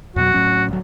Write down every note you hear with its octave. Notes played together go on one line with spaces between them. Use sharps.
F2 B2 F#3 F#4
A2 F#3 C#4
D1 F#3